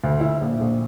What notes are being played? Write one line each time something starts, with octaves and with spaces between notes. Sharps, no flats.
D2
E4
A#1
A#1